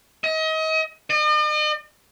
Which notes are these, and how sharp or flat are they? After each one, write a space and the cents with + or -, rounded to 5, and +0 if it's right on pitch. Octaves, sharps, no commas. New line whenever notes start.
D#5 +35
D#5 -45